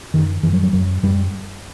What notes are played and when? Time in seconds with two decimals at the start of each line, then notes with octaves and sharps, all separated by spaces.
0.14 F#2 D#3
0.43 F#2 E3
0.53 F#3
0.63 F#3
0.73 F#2 F#3
1.03 F#2 G3